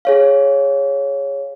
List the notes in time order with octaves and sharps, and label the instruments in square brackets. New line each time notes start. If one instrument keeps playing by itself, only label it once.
[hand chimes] G#4 C#5 F5